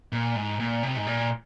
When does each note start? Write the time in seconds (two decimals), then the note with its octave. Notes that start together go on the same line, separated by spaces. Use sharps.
0.12 A#2
0.36 G#2
0.60 A#2
0.83 C3
0.97 G#2
1.07 A#2